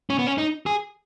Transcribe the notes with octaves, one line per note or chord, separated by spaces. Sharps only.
C#4
B3
C#4
D#4
G#4